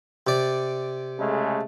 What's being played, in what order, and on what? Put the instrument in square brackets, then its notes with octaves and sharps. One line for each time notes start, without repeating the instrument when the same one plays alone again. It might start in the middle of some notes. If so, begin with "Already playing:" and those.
[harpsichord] C3 D5
[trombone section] C#3 G#3 A3